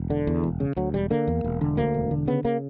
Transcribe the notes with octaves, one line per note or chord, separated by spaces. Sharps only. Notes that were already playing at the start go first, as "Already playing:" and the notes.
Already playing: E1
D3
E2
E1
C#3
D2 F#3
E1 G3
D3 A#3
E2
E1
D3
D2 A#3
E1
D3
C#3 B3
C#3 A#3